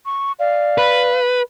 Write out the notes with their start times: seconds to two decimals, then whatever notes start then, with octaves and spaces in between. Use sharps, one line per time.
0.06 C#6
0.39 D5 F5
0.78 B4